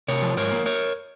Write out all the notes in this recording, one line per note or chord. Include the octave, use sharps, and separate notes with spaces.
C3 A#4 C#5
F3
G#2 A#4 C#5
A#3
A#4 C#5